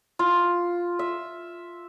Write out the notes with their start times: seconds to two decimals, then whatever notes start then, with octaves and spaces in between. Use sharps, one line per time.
0.19 F4
0.99 E5